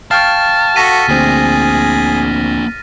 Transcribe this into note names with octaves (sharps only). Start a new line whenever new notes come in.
F5 G5 A5 C#6 F6 A6
F#4 A4 A#6 B6 D#7
D2 A#3 C4 D4 G#4